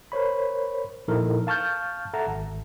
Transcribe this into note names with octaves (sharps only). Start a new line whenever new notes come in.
A#4 C5 C#5 B5
A#2 F3 D#4 E4 A4 A#4
F5 A5 C#6 F6 G6
A4 E5 F#5 A5 A#5
G#1